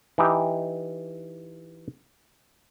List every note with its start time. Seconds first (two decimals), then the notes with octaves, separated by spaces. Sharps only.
0.18 E3 D#4 G4